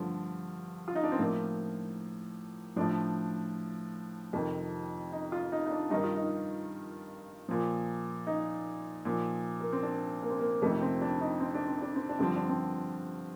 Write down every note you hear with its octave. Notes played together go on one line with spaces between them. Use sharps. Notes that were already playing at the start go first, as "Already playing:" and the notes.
Already playing: G2 D3 F3 A3
F4
D#4
D4
C4
A2 F3 A#3
A2 F3 D4
F2 C3 D#3
D#4
F4
D#4
D#4
D4
G2 D#3 D#4
F4
D#4
A#2 F3
D#4
A#2 F3
A#3
C4
D4
A#3
C4
A#3
F2 C3 D#3 A3
C4
D4
D#4
C4
D4
C4
D4
C4
D4
G2 D3 F3 C4
D4
C4